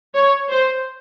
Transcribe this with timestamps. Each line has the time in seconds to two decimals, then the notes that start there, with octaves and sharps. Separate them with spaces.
0.15 C#5
0.51 C5